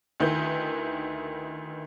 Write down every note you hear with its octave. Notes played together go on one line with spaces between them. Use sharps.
D2 D#3 E4 B4 G6